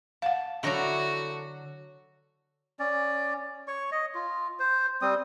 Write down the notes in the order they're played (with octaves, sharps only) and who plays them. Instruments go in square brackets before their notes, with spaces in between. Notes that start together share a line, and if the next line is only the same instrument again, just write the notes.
[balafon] F5 F#5 [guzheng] A5
[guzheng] D3 F#3 D4 [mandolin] A3 E4 A#5 [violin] F#4
[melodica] C#4 D5
C#5 C#6
D#5
F4
C5
G3 C4 D#6